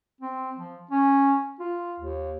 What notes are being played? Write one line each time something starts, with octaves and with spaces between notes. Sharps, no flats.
C4
F3
C#4
F4
D#2